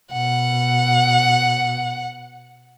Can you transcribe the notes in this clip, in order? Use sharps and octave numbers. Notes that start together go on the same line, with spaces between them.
B2 F#5